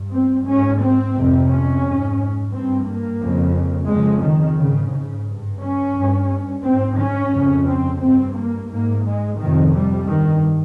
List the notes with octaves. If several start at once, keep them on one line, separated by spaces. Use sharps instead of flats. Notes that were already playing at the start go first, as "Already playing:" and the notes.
Already playing: G2
C4
G#2 C#4
C4
F2 C3
C#4
G#2
G2 C4
A#3
F2 C#3
F2 C#3 G#3
D#3
G#2 C#3
C#3
G2
C#4
G2
G#2 C4
C#4
F2 C#3
C4
G2 C4
A#3
G#2 A#3
G#3
F2 C3 D#3
G3
G2 D#3